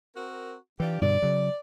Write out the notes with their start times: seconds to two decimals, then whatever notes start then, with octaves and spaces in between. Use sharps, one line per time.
0.15 C4 F#4 A#4
0.80 E3 D4 F4 G4
1.02 G2 B2 D3 D5
1.22 C#3 F#3